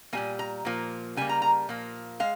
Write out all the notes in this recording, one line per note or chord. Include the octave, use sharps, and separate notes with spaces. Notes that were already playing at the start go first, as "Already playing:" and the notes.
A#2 G3 A#3 G#5
A#5
A#2 F3 A#3
C#3 G3 A#3 G#5
A#5
A#5
A#2 F3 A#3
G#3 F5